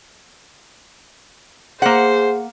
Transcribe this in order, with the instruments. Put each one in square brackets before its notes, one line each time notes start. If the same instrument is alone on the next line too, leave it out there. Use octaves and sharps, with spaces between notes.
[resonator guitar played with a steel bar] A#3 F#5 [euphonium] G#4 [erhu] C5